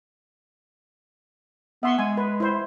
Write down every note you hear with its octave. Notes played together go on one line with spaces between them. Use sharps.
B3 E5 C6 C#6
G#3 G#5
B4
E4 C5